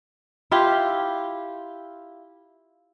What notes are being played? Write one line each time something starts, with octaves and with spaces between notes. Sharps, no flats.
E4 F4 G4